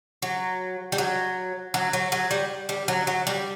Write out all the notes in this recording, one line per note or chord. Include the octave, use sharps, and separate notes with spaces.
F#3
G3
F#3
F#3
F#3
F#3
G3
G3
F#3
F#3
G3